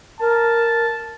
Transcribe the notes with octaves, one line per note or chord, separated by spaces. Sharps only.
A#4 A5